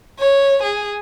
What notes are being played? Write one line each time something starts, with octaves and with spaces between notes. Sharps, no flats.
C#5
G#4